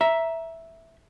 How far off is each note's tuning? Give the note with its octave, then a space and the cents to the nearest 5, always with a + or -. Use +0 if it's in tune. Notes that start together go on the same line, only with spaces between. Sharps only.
E5 +0 A#5 +15